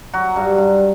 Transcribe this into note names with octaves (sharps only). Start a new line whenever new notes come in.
F#3 F#4
G2
G2